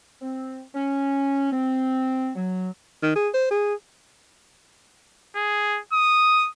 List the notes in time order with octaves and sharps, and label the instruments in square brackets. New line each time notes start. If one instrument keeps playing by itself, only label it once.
[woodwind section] C4
C#4
C4
F#3
[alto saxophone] D#3
G#4
C5
G#4
[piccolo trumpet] G#4
D#6